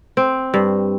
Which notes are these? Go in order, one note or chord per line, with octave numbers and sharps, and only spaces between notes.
C4
G2